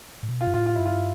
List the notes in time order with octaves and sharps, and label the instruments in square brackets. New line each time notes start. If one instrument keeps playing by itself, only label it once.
[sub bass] A2
B2
[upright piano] F4
[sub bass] G2
[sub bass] A2 [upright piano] F4
[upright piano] F4
[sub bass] G2 [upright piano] E4
[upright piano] F4